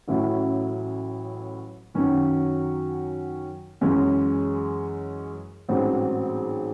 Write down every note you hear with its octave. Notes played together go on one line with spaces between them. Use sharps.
A1 A2 F#3 C#4 E4
F#2 D#3 F#3 C#4 F#4
F#2 E3 G#3 C#4
A1 G#2 F#3 C4